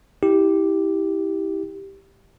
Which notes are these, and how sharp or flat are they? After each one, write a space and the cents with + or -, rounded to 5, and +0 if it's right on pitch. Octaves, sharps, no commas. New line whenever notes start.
E4 -25 G4 +0